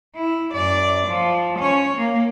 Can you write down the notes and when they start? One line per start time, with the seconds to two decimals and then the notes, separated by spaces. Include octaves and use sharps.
0.15 E4
0.53 F#2 D5
1.07 F3
1.59 C#4 C#5
1.96 A#3